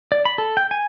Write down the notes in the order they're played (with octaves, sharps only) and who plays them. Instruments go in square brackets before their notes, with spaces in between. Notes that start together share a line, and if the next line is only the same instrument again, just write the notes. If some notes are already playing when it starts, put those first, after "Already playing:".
[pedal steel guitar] D5
B5
A4
G5
G#5